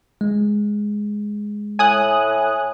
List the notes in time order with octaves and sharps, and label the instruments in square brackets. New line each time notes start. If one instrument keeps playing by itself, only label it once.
[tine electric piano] G#3
[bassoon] A2 [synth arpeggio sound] G#5 D#6 F#6